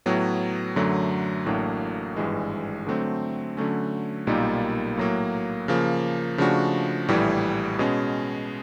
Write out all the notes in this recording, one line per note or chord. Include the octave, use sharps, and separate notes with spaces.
A2 F#3 B3
F#2 D3 F#3 A3
A1 A2 F#3 A#3 D4
G#1 G2 E3 G#3
D3 F#3 A3 C4
D3 F#3 A3 C#4
B1 A#2 G3 A#3 D#4
A2 F#3 A#3
C#3 F3 A#3
C#3 F3 A3 D4 F#4
A#1 A2 E3 G3
B2 G#3 C#4